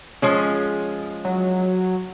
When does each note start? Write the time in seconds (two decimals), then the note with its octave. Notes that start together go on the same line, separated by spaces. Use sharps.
0.22 F3 G#3 C#4
1.25 F#3